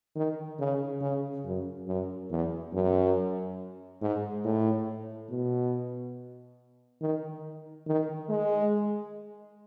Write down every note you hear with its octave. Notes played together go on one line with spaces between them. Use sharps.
D#3
C#3
C#3
F#2
F#2
E2
F#2
G#2
A2
B2
D#3
D#3
G#3